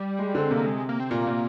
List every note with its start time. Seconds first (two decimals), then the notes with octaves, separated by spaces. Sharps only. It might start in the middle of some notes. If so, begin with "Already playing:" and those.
Already playing: G3
0.19 G#3
0.35 D3 C4
0.51 C3 A#3
0.66 G#3
0.89 A#3
1.00 C4
1.10 A#2 A#3
1.27 A#2